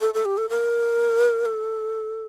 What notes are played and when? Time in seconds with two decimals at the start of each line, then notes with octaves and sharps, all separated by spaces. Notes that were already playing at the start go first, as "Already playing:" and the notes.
0.01 A4
0.14 A4
0.25 G4
0.37 A4
0.49 A#4
1.45 A4